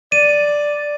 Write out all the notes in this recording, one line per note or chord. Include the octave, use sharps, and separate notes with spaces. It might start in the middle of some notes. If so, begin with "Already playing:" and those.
D5 D#7